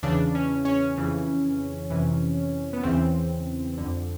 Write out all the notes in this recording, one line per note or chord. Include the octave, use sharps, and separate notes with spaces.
E2 C#3 E3 D4
C#4
C#4
F2 C#3 E3
F2 C3 E3
B3
E2 C#3 E3 C4
F2 D3